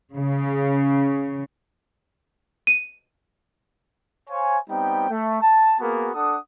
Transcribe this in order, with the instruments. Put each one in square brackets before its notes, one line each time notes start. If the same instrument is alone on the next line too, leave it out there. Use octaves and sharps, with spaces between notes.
[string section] C#3
[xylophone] D#7
[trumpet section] C5 C#5 F5 G#5
G3 B3 C4 D#4 G5
A3
A5
A#3 B3 F#4 G#4 A#4
D4 A4 F#5 D#6